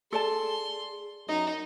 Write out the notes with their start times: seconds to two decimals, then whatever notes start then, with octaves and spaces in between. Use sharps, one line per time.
0.13 G#4 A4 D5 A5 C6
1.29 F#2 D#4 D#5